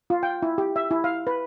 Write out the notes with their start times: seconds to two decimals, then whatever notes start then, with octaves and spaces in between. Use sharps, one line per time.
0.10 F4
0.23 G5
0.42 E4
0.58 G4
0.76 E5
0.91 E4
1.04 F5
1.27 B4